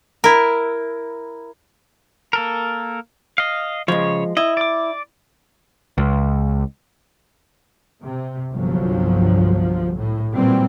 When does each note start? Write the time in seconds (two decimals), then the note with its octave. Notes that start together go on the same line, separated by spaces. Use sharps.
0.24 E4 A#4
2.33 A#3 A4 A#4
3.38 D#5 F5
3.88 C#3 F3 G#3 C#5
4.37 E4 D#5
4.57 D5 D6
5.98 C#2
8.03 C3
8.53 G1 C2 F3 F#3
9.98 A2
10.36 A#2 E3 F#3 G3 C4